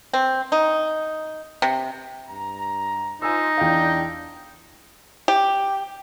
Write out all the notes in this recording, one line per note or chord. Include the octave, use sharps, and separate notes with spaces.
C4
D#4
C3
G2 A#5
D#4 F4 C5 G#5 E6
E2 D4 F5 G5
G4